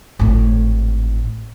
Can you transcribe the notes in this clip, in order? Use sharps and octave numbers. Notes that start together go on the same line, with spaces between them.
G#1 A2